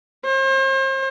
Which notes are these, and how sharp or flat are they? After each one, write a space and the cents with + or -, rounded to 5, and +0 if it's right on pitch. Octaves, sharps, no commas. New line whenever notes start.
C5 +40